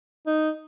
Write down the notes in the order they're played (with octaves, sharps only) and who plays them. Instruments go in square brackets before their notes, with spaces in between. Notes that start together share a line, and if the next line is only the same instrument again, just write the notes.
[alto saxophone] D#4